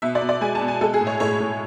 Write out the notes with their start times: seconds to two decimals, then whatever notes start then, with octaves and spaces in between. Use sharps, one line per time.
0.02 B2 E5
0.15 D5
0.22 B2
0.29 D5
0.41 G#3 G#5
0.55 A5
0.61 B2
0.68 G#5
0.81 G#3 A4
0.94 G#4
1.01 A2
1.07 C#5
1.20 A2 C#5
1.40 A2